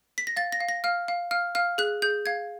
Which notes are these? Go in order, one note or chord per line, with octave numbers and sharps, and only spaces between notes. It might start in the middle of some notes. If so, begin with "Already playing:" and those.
B6
A#6
F5 A6
A#6
F5
A#6
F5 F6
F5
F5 F6
F5 F6
G#4 F#6
G#4 G6
F5 G#6